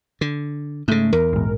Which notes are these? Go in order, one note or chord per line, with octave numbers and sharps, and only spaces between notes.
D3
G#2 C#3 A3
E2 A#4
A#1 G#2